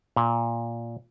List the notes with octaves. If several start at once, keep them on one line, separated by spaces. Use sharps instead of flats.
A#2